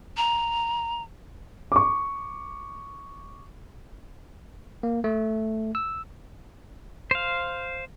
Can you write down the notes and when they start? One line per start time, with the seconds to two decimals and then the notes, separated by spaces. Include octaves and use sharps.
0.17 A#5
1.72 C#6 D6
4.83 A#3
5.04 A3
5.75 E6
7.11 C5 F5